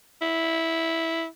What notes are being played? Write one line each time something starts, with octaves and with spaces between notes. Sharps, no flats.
E4